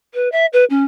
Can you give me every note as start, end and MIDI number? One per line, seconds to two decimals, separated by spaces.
0.14 0.30 71
0.32 0.46 76
0.53 0.65 71
0.70 0.84 61